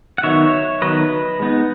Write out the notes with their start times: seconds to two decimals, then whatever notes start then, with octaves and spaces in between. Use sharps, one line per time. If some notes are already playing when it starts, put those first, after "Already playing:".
0.18 F#5
0.23 D#3 F#3 B3 D#4 C#5 E5
0.82 D#3 F#3 B3 D#4 B4 D#5
1.40 G#3 B3 D#4